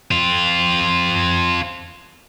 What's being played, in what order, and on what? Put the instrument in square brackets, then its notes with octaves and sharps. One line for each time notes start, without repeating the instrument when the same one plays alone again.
[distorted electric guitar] C4 F4